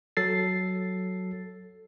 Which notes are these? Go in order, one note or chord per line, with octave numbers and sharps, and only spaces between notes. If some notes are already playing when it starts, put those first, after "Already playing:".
F#3 A4 A6 C7